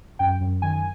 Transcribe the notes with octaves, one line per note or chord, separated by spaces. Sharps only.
F#2 G5
F#2
D#3 G#5